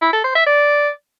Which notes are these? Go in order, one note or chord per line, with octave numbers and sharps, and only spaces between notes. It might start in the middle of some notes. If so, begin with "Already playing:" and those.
E4
A4
C5
E5
D5